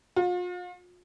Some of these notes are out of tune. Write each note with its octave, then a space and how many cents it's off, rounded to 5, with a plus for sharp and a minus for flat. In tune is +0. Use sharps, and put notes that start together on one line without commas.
F4 +40